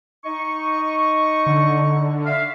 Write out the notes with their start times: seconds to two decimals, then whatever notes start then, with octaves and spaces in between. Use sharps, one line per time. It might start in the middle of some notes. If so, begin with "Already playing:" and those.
0.24 D#4 D#5 C#6
1.47 D3
2.25 E5 F5